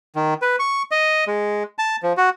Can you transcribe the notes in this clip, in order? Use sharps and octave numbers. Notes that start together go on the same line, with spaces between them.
D#3
B4
C#6
D#5
G#3
A5
F3
F#4